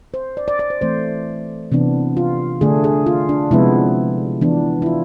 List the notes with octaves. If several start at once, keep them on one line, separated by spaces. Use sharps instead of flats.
C5
D5
D5
D5
C5
E3 A3 C4 C5
C3 E3 B3 D4
F4
D3 A3 D4 G#4
G#4
F4
D4
C3 F3 G#3 B3 E4
E3 B3 D4
E4
F4